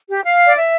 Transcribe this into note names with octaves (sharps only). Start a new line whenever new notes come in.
G4
F5
D5
E5